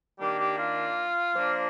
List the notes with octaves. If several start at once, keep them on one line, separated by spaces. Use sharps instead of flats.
D#3 A#3 D4 G4
G4
F4
F3 A#3 D4